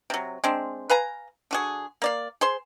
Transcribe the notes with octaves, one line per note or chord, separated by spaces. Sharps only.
C3 F#3
G#3 C4 D4
B4 F5 G#5 A#5
D3 F#4 G#4
A#3 D5 F5
G#4 C5 C6